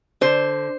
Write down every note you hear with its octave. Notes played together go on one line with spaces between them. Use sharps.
D3 C5